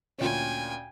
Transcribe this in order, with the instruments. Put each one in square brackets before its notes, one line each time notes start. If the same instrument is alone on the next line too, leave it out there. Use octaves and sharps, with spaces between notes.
[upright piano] D2 A#2 C#4 [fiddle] G5 G#5